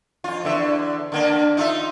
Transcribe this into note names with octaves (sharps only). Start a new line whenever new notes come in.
F2 F4
E2 D3 E5
D3 A#3 D4
D#4 F4 E5